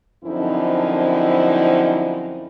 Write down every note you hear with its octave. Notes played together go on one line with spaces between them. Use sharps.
F#2 D3 F3 C4 D#4 E4